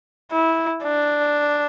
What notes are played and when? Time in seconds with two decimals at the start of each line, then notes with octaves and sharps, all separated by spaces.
0.32 E4
0.84 D4